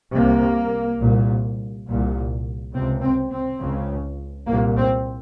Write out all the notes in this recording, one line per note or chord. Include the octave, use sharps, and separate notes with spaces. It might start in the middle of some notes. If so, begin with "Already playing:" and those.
C2 C3 A#3
C2 A#2
C2 A#2
C#2 C3 C4
C4
C4
C#2 C#3
C2 A#2 A#3
C4